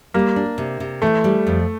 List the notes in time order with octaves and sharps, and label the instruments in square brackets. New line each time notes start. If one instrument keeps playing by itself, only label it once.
[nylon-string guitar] G3 [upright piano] A#3
[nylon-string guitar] D4
C3
C3
[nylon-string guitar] E3 [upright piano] A3
[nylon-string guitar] G3
F2